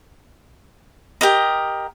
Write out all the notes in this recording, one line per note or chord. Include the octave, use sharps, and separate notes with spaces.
G4 A#4 D#5